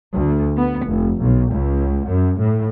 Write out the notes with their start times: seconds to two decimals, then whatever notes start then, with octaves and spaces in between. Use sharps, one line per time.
0.13 D2
0.57 B3
0.87 F1
1.22 B1
1.53 C#2
2.06 F#2
2.40 A2